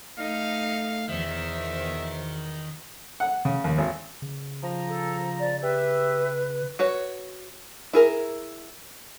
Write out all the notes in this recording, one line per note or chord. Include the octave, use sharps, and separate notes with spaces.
A3 D#4 F5
E2 B2 D#3 C5 E5
F#5
C#3
D#2
G#1
C#3
F3 A#5
A4
D5
G4 B4 E5
F#4 B4 C#5
E4 G#4 A#4